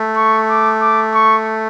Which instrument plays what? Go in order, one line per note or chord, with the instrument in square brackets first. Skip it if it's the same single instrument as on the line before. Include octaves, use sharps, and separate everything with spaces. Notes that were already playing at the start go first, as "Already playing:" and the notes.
Already playing: [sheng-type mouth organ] A3
[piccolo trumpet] C#6
D6
D6
C#6